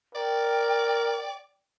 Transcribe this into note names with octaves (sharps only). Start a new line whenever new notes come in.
A#4 D5 G5